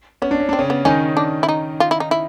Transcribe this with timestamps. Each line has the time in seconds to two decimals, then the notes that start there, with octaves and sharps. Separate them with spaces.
0.22 B3 C#4
0.31 D4
0.40 C#4
0.49 C4 D4
0.59 C#3 C#4
0.70 B3
0.85 D#3 C#4 D#4
1.17 D4
1.43 E4
1.49 D#4
1.80 F4
1.91 E4
2.00 D#4
2.11 E4